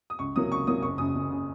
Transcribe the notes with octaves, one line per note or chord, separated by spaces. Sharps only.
D#6
C#2 C#6
C3 F#3 A#3 D#6
C#2 C#6
C3 F#3 A#3 D#6
F#1 C#6
F#2 C#3 D#6
F#1
C#3